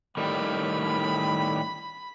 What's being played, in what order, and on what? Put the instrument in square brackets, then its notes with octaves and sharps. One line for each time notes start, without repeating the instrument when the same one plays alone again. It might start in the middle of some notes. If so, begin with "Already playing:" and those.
[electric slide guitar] A2 D#3 G3 [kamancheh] B5